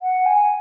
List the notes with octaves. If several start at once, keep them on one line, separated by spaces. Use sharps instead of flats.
F#5
G#5